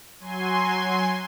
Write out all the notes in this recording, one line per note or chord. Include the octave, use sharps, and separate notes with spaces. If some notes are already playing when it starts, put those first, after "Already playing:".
F#3 G#5 C6